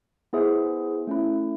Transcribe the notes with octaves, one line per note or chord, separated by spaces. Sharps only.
B3 E4 G#4 C5 E5
A3 C#4 E4